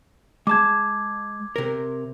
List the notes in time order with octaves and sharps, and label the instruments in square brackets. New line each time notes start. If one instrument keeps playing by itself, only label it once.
[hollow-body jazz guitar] G#3 A5 [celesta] D6 G#6
[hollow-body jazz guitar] C3 A#4